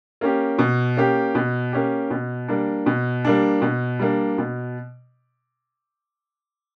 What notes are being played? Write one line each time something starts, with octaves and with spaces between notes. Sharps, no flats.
A#3 C#4 G4
B2
A#3 C#4 G4
B2
A#3 C#4 G4
B2
G3 A#3 D4
B2
G3 A#3 D4
B2
G3 A#3 D4
B2